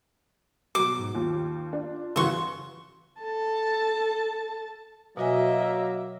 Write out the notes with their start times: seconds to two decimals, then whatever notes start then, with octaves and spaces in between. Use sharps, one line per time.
0.75 B2 F#3 D6
0.98 G#2
1.15 D#2 F4
1.73 D4
2.16 C#3 E3 F#4 C6 C#6
3.21 A4 A5
5.17 B2 F#3 A#3 F#4 D#5 E5 G#5